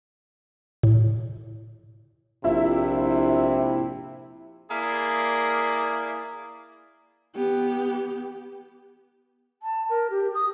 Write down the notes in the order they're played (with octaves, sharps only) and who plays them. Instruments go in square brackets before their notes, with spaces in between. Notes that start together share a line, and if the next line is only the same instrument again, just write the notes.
[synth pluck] A2
[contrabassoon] A#1 [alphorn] C3 [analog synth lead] E4 [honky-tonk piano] F4 E5
[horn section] A#3 E4 G#4 D5
[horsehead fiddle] B3 G4
[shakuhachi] A5
A#4
G4
D#6